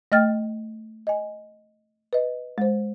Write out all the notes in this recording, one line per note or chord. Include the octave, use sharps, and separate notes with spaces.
A3 D#5 G5 F6 A6
D#5 G#5
B4 D#5
G#3 C5